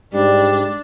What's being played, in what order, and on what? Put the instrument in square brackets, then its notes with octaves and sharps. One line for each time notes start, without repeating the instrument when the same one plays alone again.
[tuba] G#2 [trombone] G3 [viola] D4